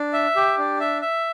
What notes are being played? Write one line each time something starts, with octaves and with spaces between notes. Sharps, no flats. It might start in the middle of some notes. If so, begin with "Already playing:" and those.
Already playing: D4
E5
G4
D4
E5
E5